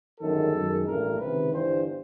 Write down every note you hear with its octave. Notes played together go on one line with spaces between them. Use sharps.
G1 F#2 D#3 G#3 A4
F#2 D#3 G#3
A1 G2 E3 A3 A#4
C#2 C3 D#3 B4
G1 G2 E3 C5